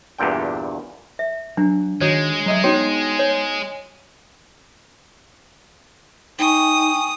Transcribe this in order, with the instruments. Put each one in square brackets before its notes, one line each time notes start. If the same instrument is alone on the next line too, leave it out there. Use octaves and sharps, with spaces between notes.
[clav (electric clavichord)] E2 G2 A#2 D3 G5
[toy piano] E5
[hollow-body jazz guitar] F#3 [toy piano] D4
[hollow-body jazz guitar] D#3 F#4 [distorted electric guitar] G#3 [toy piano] C#5
[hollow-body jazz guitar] F#3 D#5 E5
[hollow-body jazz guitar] B3 D#4 [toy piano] F#4 C#5 G5
[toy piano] C#5
[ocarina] D#4 [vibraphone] G5 G#5 C#6 [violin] D#6